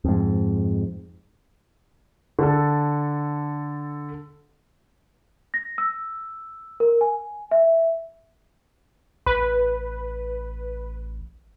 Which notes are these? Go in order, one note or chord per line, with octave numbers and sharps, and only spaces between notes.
F2 G#2
D3 A4
A#6
E6
A#4
G#5
E5
A1 B4